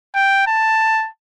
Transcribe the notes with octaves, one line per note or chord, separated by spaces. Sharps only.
G5
A5